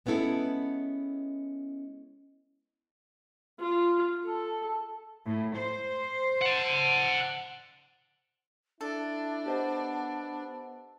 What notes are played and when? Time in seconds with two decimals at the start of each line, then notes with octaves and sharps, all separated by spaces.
0.06 G#3 B3 C#4 E4 A4
3.60 F4
4.26 A4
5.24 A2
5.55 C5
6.42 F#5 A5
8.81 D4 E4 A4
9.46 B3 G4 C5 D#5